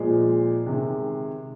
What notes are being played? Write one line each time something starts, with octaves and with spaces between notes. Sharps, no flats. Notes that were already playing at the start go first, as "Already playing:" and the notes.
Already playing: A#2 F3 G#3
C3 D#3 G#3